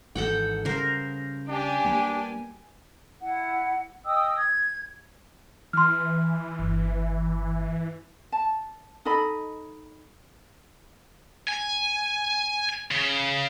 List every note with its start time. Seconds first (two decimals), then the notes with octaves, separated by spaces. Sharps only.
0.15 G#1 G#2 E3 A4 F#5 G5
0.65 C#3 G3 A#4 C5
1.48 D4 G4 G#5
1.85 G3 A#3 B3
3.20 E4 F#5
4.05 D#5 G5 D#6 E6
4.39 G#6
5.73 E3 C6 F6
6.59 G1
8.32 A5
9.05 D#4 A4 D#5 B5
11.49 G#5
12.91 C#3